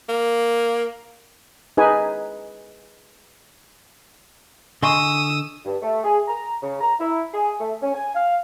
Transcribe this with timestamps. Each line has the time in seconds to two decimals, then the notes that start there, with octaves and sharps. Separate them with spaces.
0.09 A#3
1.77 D#4 G#4 B4 G#5
4.83 D3 D#5 G#5 C6 C#6 D#6 E6
5.65 G2
5.82 A3
6.04 G#4
6.28 A#5
6.62 C#3
6.81 A#5
7.00 E4
7.34 G#4
7.59 A3
7.82 C#4
7.95 G#5
8.15 F5